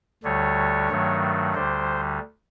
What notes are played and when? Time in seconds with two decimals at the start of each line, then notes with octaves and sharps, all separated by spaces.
0.24 D2 D3 G3 C#5
0.90 G2 D#3 F#3 A3
1.55 D2 D3 G3 C5